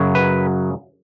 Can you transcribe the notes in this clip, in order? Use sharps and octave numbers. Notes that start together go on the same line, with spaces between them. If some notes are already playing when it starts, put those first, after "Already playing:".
Already playing: F#2 C#3 F#3
B4